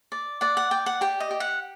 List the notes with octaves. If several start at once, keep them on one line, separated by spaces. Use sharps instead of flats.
D5
D5 F#5
F#5
D5 G5
F#5
G4 G5
D#5
G4
F#5